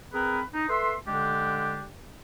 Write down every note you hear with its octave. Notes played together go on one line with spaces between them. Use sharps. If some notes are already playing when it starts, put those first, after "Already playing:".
C4 G#4 A#4 B4
D#4
A4 B4 E5 C6
D3 G#3 D4 G4